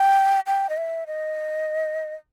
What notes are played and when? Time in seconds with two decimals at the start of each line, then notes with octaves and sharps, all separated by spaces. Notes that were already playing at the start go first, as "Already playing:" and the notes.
Already playing: G5
0.47 G5
0.69 D#5
0.77 E5
1.07 D#5